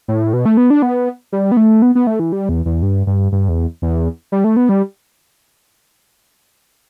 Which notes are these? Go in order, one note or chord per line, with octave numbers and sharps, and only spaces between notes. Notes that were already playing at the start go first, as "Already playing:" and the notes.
A2
B2
A3
B3
D4
B3
G3
B3
A3
B3
B3
A3
E3
G3
E2
E2
G2
G2
G2
E2
E2
G3
A3
B3
G3